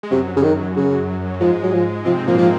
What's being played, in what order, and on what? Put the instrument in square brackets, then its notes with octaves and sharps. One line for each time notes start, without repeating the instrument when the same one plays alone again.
[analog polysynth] G#3
[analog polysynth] F#2 F#3 [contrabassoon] C3
[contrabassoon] C#3
D#3
C#3
[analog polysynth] F#3
[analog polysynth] G#2 G#3 [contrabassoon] F3
[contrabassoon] F#3
F3
[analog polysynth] C3 C4 [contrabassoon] F3
[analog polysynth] A#2 A#3 [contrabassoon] F3
[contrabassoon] F3